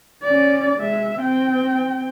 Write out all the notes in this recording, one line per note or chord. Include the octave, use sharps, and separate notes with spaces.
C#4 D5
G#3 E5
C4 G5